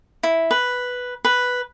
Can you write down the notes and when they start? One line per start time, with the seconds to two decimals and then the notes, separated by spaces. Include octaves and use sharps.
0.23 E4
0.51 B4
1.25 B4